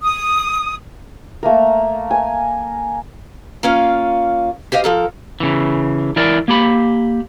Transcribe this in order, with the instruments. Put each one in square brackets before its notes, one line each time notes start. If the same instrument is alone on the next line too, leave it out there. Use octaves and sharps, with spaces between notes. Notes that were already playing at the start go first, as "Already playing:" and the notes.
[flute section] D#6
[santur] A3 A#3 A#4
G#5
[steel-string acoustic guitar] A#3 C#4 F4 F5
G4 C5 D#5 F5
F3 A4 A#4
[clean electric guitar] C#3 E3
E3 E4 A#4 D5
A#3 G4 B5